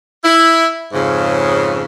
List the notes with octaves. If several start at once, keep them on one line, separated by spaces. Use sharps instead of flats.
E4
F2 G#2 C#3